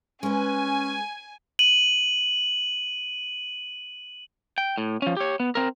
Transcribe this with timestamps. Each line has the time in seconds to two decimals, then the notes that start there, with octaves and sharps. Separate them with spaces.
0.23 G#3 C#4 B4 G#5
1.59 D#7 F#7
4.58 G5
4.78 A2
5.02 F3 C#4
5.17 G4 C#5
5.40 B3
5.55 C4 A#4